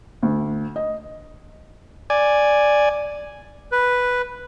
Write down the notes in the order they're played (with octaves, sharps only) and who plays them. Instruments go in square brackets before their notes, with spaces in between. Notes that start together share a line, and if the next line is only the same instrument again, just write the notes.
[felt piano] D2
D#5
[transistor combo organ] D5 G#5
[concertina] B4